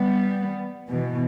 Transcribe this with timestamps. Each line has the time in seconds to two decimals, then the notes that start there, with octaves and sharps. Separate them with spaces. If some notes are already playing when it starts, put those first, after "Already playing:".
Already playing: G3 B3
0.88 B2 E3